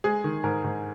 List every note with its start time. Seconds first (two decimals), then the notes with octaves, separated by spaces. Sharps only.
0.04 G#3 G#4
0.24 D#3
0.44 G#2 A#4
0.64 G#2